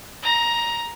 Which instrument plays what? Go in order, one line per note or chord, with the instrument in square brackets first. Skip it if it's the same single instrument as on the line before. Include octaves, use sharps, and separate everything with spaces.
[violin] A#5 A#6